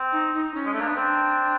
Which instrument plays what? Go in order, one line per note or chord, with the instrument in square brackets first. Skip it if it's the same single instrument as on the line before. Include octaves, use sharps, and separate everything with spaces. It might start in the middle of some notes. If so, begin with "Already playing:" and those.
Already playing: [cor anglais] C4
[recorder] D#4
D#4
C#4
[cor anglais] G#3
[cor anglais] A3 [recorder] D4
[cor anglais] A#3
B3
[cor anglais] C4 [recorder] D4